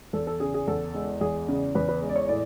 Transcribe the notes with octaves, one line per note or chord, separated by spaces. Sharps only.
E2 A4
A4
C#3 G#4
G#4
E2 A4
G#3
E2 G#4
C#3
E2 B4
B4
G#3
D5
C#5
A2 D5